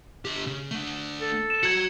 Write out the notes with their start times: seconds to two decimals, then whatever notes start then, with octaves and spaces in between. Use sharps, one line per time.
0.25 D3 G4
0.46 C#3
0.71 A3 D4
1.21 A4
1.50 E7
1.63 F#4 A#5 G#6 C#7